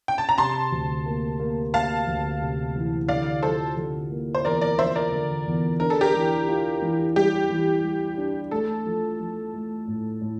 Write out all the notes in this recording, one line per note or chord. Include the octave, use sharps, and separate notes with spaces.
G5
A5
A#5
C3 A5 C6
D2
A#3
A#3
A#3 F5 A5
D2
C3
E3
D3 D5 F5
F3 A4 C5
D3
A#3
C5
E2 A#4 D5
A#4 D5
F3 C5 E5
A#4 D5
D3
E2
D4 A#4
A4
G4 A#4
E3
F4
E3
G3 G4
E3
G3
D4
A3 A4
F3
F3
A3
A2
A2